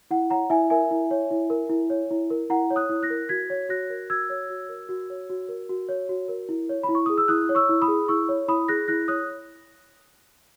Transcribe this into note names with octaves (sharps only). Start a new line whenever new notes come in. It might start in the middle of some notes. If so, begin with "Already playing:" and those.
E4 F#5
C#5 F#5 A#5
E4 E5 G#5
A#4 E5 G#5
E4
C#5
E4
A#4
E4
C#5
E4
A#4
E4 F#5 A#5
C#5
D#6 F#6
E4
F#6 A#6
A#4
F#4 G#6 B6
C#5
F#4 F#6 A#6
A#4
F#4 E6 G#6
C#5
F#4
A#4
F#4
C#5
F#4
A#4
F#4
C#5
F#4
A#4
E4
C#5
B5
E4
C#6
G#4 D#6
E6
E4 D#6 F#6
C#5
C#6 E6
E4
B5 D#6
G#4
E4 C#6 E6
C#5
E4 B5 D#6
G#4 F#6 A#6
E4 F#6 A#6
C#5 D#6 F#6